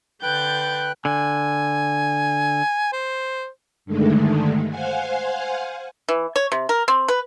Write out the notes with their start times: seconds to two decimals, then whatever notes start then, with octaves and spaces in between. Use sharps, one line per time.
0.23 D3 B4 G5 F#6 G6 A6
1.05 D3 G#5
2.92 C5
3.85 G2 D3 D#3 G#3 A3
4.69 C5 F5 F#5 G#5
6.09 E3
6.36 C#5
6.52 C3
6.69 A#4
6.88 C4
7.08 B4